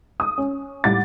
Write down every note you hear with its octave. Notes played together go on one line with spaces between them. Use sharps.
D#6
C#4
A2 G3 F#5 D6 A6